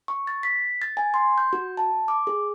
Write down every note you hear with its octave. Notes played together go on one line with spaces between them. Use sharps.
C#6
A6
B6
A6
G#5
C6
G6
F#4
A5
D6
G#4